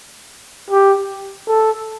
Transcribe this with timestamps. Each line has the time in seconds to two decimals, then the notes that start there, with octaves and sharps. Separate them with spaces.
0.70 G4
1.48 A4